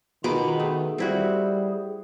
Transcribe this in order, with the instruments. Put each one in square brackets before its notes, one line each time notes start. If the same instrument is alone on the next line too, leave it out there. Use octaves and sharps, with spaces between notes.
[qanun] B2 G#4 D6 [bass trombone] D#3 [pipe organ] F4 A#5 B5
[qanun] A3 [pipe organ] G#4
[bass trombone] G3 [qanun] C4 E4 F#4